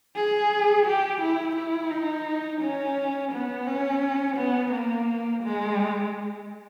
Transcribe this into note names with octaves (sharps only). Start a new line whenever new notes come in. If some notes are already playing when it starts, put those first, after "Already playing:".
G#4
G4
E4
E4
D#4
C#4
B3
C#4
B3
A#3
G#3